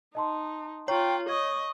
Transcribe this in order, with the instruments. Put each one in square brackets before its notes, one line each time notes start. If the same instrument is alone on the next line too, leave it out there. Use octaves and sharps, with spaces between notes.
[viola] D#4 [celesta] D#5 A5 C6
[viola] F4 [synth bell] C#5 [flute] G5 [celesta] A#5 C#6
[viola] D#5 [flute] C#6 [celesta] G#6